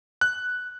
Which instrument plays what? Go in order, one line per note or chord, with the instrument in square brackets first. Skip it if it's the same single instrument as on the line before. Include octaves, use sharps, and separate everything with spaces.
[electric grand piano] F#6